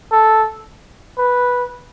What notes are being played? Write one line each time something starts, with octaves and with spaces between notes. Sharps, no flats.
A4
B4